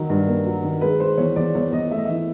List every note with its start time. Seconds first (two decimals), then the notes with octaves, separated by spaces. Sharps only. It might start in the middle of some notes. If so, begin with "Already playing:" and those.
Already playing: D#3 F#3
0.10 G2
0.27 A#3
0.46 F#3
0.63 D#3
0.81 G#3 B4
1.00 G#3 C5
1.18 E2 C#5
1.36 E2 D5
1.55 E2 C#5
1.72 E2 D#5
1.91 A3 E5
1.99 D#5
2.05 E3 E5